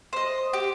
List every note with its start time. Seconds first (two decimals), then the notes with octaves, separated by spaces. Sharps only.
0.13 C5 D#5
0.53 G4